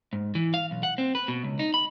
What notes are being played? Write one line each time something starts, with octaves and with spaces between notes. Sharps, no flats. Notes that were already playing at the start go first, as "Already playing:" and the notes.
G#2
E3
F5
B1
F#5
C4
B4
B2
C#2
D#4
B5